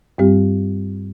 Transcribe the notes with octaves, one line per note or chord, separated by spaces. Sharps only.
G2 G3 C4 G4